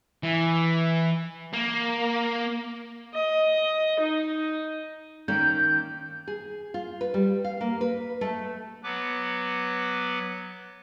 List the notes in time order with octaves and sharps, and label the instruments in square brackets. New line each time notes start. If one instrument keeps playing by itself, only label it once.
[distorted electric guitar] E3
A#3
[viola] D#5
D#4
[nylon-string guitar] D#3 A#3 C#4 [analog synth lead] G6
[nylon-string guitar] G#4
F4
B4
G3
F5
A#3
B4
A3
[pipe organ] F#3 B3 B4 D6